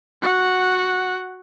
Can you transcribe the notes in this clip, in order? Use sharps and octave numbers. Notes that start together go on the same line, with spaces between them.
F#4 F#5